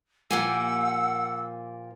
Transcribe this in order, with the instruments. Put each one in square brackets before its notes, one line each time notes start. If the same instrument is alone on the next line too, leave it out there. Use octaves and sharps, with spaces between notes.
[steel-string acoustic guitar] A#2 F3 A#3 [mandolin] G4 G#5 [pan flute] F#5 [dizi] E6